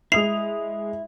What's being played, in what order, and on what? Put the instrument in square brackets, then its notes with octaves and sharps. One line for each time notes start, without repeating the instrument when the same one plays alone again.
[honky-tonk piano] G#3 D#6 F7 [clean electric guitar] E4 [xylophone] C7